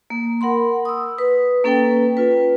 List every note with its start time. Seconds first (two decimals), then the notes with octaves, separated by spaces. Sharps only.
0.10 A#3
0.41 A#4 F#5 B5 C6
0.85 D#6 E6
1.18 B4
1.64 A#3 C#4 A4 B4 G5
2.17 F4 B4